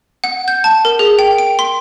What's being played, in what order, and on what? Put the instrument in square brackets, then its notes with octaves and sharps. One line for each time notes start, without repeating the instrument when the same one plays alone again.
[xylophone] F#5
G6
A5
A#4
G#4
G5
D7
C6